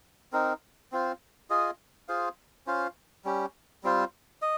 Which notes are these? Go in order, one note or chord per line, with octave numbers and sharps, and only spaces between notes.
C4 D#4 A#4
C4 F4 C5
F4 G#4 D#5
F4 G#4 C5 F5
C#4 F4 C5 F5
G3 C#4 G4
G3 C4 F4 C5
D#5